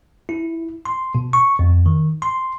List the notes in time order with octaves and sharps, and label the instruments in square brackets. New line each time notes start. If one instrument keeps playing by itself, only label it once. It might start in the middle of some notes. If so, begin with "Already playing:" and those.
[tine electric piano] E4
C6
B2
C#6
F2
D#3
C6